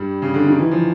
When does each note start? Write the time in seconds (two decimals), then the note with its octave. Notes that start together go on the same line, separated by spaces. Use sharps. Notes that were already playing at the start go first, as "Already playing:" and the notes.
Already playing: G2 G3
0.22 C#3
0.34 D3
0.47 D#3
0.59 E3
0.71 F3